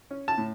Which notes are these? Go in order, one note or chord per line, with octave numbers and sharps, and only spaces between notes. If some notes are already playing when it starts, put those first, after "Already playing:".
C#4
A5
A2